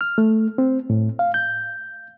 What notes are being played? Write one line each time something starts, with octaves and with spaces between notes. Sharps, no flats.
F6
A3
C4
A2
F5
G6